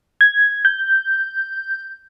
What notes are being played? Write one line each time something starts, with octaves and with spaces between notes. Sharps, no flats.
G#6
G6